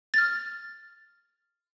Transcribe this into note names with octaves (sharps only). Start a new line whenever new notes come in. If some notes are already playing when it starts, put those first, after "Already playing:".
F6 A6